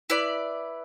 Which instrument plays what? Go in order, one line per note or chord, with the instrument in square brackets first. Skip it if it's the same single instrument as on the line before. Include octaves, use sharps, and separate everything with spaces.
[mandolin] E4 B4 D5